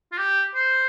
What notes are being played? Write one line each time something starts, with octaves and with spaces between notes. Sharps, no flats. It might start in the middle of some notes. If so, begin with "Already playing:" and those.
F4
G4
C5